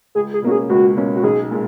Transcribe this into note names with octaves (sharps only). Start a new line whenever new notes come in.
C#2 G#4
G#4
B2 A#3 C#4 F#4
G#4
C#2 F#4
B2 A#3 C#4
F#4
B1 G#4
A#2 G#3